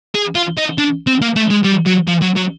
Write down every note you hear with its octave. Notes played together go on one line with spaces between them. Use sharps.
G#4
F4
D#4
D4
C4
A#3
A3
G#3
G3
F#3
F3
F#3
F#3